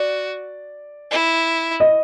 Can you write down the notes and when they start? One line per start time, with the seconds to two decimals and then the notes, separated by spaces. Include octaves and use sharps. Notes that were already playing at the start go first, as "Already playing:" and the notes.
Already playing: F#4 D5
1.11 E4
1.80 D#5